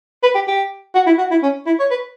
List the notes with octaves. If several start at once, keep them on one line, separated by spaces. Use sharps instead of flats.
B4
G4
G4
F#4
E4
F#4
E4
C#4
E4
C#5
B4